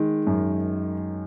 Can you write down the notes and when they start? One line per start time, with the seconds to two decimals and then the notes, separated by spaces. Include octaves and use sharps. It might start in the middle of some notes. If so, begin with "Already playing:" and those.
Already playing: D#3 G#3
0.27 F#2